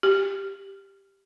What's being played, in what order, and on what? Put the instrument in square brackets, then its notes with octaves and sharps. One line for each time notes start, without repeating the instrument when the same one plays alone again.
[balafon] G4